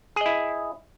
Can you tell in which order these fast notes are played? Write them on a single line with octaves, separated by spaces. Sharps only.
G#4 D#5 E4